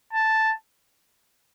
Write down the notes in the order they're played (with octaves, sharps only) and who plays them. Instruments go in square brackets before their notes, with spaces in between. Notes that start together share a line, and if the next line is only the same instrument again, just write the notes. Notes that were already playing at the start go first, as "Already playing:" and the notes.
[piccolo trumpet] A5